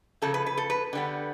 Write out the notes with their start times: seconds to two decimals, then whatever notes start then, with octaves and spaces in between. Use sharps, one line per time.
0.22 C#3 F3 A#3 A4
0.34 B4
0.46 B4
0.57 A4
0.70 B4
0.93 D3 G3 B3